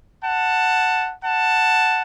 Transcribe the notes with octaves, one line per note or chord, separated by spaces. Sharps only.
F#5 A5
F#5 A5